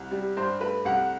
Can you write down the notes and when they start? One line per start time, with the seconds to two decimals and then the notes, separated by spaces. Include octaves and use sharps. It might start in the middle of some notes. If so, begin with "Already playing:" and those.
Already playing: C2
0.11 G3
0.37 G2 C5
0.60 A3 B4
0.85 C2 F#5